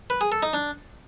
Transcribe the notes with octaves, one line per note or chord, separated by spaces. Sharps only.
B4
G#4
A4
D#4
D4